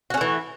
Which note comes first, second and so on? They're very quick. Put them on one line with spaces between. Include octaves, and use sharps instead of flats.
F#4 C#4 A3 E3